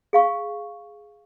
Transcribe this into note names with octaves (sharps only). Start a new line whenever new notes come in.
G#4 F5 C#6